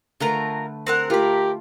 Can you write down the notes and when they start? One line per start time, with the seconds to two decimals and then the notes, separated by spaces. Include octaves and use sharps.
0.20 D3 A3 F4 A#4 B4 A#5
0.87 C4 A#4 F#5
1.10 A3 F4 G4 A#4 B5